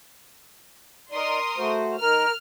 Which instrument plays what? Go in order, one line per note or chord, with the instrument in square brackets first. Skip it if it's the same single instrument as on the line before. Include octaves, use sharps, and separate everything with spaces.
[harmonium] D#4 D5 [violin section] A#4 C6 D#6
[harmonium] A3 F#4 C5
[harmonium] D#3 [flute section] A#4 [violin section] F6